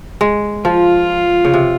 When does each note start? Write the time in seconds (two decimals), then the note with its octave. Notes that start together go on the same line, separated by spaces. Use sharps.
0.21 G#3
0.65 F3 F4
1.45 C#3
1.54 C3